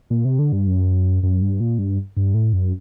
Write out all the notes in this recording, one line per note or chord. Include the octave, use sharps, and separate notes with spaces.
A#2
C3
D3
G2
F#2
F#2
G2
A#2
G2
G2
A2
F#2